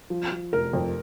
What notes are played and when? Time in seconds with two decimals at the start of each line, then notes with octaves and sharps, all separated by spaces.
0.10 F3
0.32 F3
0.53 F1 A#4
0.73 F2